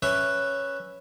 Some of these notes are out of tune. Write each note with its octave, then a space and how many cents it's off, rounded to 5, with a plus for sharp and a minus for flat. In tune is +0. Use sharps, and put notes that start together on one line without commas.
C#4 +0 B4 +0 E5 +5